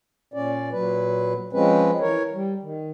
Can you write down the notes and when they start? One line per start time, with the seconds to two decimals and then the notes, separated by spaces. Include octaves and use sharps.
0.34 A#2 C#4 D5
0.72 A#2 F#3 B4
1.53 F3 G#3 C4 C#4 B4
2.00 E3 A#4 C#5
2.33 G3
2.63 D#3